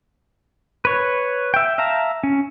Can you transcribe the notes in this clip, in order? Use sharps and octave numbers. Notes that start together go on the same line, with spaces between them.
B4 C#5
E5 G5
E5 F5 A5 A#5
C#4